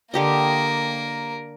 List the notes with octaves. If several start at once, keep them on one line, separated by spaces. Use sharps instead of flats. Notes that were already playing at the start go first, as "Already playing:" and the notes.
D3 A#3 G4 A#4 D#5